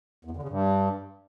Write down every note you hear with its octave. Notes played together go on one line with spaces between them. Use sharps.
E2
F2
D3
C#3
G2